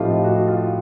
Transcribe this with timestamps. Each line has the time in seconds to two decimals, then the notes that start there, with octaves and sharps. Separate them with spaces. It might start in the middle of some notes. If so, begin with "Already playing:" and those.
Already playing: A2 F3 A3 C4 D#4 F4 G4
0.24 F#4
0.47 F4